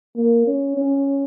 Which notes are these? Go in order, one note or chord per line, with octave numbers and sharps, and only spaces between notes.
A#3
C#4
C#4